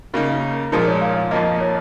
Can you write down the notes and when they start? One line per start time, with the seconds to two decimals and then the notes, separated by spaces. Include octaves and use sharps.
0.13 C#3 A#3 D#4 A#4
0.72 A#2 F3 G#3 D#4 A#4
0.87 C#5
1.01 F5
1.16 F5
1.31 F2 F3 A#3 D#5
1.60 C#5